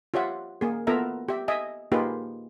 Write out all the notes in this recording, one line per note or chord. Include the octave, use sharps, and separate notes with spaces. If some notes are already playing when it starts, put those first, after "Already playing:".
F4 G4 C#5 E5 F#5
A#3 G#4
B3 F4 A4 A#4 E5 A#5
G4 E5
D#5 E5 G#5
A#3 D#4 F4 G4 G#4 B4